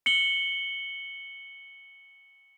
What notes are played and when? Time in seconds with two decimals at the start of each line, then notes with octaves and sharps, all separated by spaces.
0.06 C#7 F#7 G7